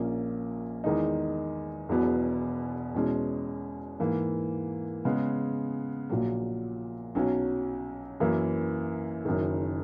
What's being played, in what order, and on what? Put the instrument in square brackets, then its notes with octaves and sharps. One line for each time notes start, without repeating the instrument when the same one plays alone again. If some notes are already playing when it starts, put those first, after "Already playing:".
Already playing: [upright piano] A#1 A#2 A#3 C#4
E2 D#3 G#3 D#4
E1 E2 B2 F#3 B3
E2 B2 G#3 C#4
G#2 E3 A#3
C#3 G#3 B3
A#1 A#2 F#3
B1 B2 F#3 C#4
F#2 E3 A#3
F#1 F#2 D#3